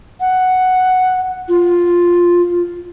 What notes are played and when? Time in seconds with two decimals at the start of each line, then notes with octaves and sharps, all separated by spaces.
0.20 F#5
1.49 F4